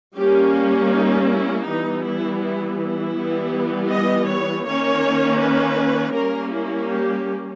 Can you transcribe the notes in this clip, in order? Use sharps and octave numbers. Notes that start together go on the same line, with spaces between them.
G3 A#3 C#4 G4
D#4
E4
E3 G3 B3 D#4
E4
E4
E4
E3 G3 B3
D#5
C#5
D#3 A#3 C#4 C#5
B4
G3 A#3 C#4 A#4
E4
G4